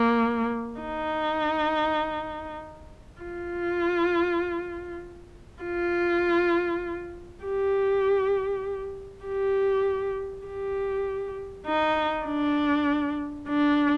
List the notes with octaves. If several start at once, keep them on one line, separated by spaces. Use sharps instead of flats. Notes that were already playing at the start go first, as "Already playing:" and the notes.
Already playing: A#3
D#4
F4
F4
G4
G4
G4
D#4
D4
D4